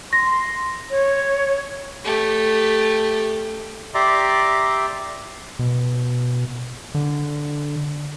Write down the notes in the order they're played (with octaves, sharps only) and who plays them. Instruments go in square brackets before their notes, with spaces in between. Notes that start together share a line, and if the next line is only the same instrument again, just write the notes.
[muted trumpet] C6 [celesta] A#6
[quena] C#5
[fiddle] A3 G4
[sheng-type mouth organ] G4 D5 E5 A#5 C6 D6
[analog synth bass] B2
D3